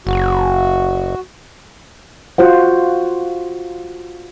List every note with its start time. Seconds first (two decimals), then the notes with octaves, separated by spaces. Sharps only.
0.07 F#1 F#4
2.38 F4 F#4 C5 F#5